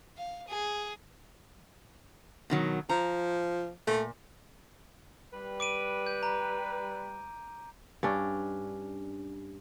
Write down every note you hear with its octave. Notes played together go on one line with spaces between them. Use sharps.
F5
G#4
B2 D#3 F#3
F3 A#5
A#2 A3
G3 B4
D6 D7 D#7
G6
A#5
G2 C#4 D4